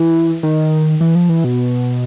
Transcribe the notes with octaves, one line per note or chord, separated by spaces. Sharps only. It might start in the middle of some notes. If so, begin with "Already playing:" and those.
Already playing: E3
D#3
E3
F3
E3
B2